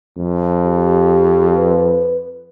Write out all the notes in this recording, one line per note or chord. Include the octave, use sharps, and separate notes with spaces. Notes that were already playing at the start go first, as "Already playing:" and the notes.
F2
G4
B4